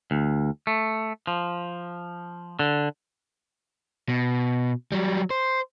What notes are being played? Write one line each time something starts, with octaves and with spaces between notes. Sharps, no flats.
D2
A3
F3
D3
B2
F#3 G3
C5